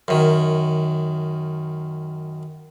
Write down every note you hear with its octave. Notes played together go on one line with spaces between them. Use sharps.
F#2 D#3